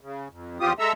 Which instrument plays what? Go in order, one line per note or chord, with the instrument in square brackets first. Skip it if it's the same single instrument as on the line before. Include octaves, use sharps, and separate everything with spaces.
[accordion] C#3
F2
E2 C4 F4 G4 D#6
G#3 A4 E5 A#5 E6